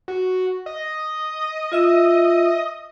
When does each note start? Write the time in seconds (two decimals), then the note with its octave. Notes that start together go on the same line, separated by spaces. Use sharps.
0.08 F#4
0.66 D#5
1.72 F4 E5 E6